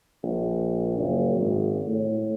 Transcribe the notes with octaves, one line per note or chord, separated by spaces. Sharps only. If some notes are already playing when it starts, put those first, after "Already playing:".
A#1
F#1
G#1
A2